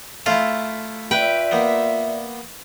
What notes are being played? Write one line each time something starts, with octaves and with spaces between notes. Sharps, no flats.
A3 E4 F4
F4 B4 D5 E5 G5
A#3 B3